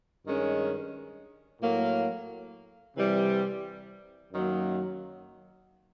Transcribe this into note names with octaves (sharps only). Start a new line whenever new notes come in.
G2 D#3 G#3 C#4
A2 F#3 A#3
C3 E3 G3
F#2 D#3 F#3 A#3